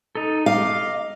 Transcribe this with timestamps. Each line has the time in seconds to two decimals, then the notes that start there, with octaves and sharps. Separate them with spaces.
0.15 D#4 A4
0.46 D#5 F5 D6